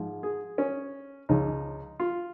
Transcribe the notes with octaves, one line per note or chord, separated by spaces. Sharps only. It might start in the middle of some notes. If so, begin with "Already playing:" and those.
Already playing: G#2 F3 G#3
G#4
C#4
C#2 C#3 F3 G#3 D#4
F4